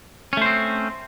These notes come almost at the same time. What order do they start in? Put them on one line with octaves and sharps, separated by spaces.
C#4 A3 C5 C4